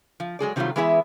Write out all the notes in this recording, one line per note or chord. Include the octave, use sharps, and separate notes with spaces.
F3
F#3 G#3 G#4 D5
C3 D#3 F#3 G3 A3 F4
E3 G#3 B3 E4 G#4 E5